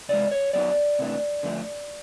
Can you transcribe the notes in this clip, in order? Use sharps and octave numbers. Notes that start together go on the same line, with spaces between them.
C3 E3 G#3 D5
C#5
F#3 B3 D#4 D5
C3 E3 A3 D4
D3 F3 A3 D4